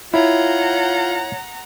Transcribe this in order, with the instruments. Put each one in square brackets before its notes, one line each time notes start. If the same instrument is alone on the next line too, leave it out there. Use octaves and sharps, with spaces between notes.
[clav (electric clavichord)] E4 [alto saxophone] F4 [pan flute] C#5 [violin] F#5 A#5